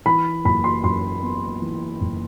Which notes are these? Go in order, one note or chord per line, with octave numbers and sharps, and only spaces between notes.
E3 B5
F#1 B5
C6
F#2 C6
B3
E3
F#1